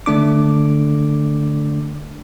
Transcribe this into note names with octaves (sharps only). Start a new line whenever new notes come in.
D3 A3 D4 D6